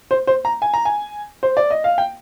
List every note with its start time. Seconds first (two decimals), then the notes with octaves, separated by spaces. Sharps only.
0.11 C5
0.27 C5
0.45 A#5
0.62 G#5
0.74 A#5
0.85 G#5
1.43 C5
1.57 D5
1.71 D#5
1.84 F5
1.98 G5